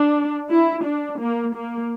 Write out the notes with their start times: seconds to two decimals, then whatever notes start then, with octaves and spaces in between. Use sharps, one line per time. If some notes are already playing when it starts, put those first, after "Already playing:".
Already playing: D4
0.50 E4
0.85 D4
1.20 A#3
1.56 A#3